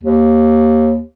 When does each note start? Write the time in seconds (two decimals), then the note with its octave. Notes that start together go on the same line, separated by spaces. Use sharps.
0.04 D#2